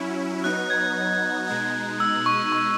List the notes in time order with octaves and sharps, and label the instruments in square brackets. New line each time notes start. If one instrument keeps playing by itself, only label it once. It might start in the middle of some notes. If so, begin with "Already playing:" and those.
Already playing: [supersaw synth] F#3 C#4 E4
[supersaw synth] F#3 B3 D#4 [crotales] F#6
[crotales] G#6
[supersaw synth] B2 G#3 D#4
[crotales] E6
C#6
C#6